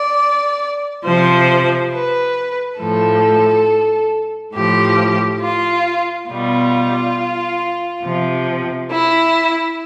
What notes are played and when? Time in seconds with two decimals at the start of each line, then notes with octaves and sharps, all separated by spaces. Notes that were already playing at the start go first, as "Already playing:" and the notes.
Already playing: D5
1.04 C3 F3 C5
1.93 B4
2.79 A2 F3 A4
4.54 A2 F3 G4
5.41 F4
6.28 B2 G3 F4
8.03 C3 F3
8.90 E4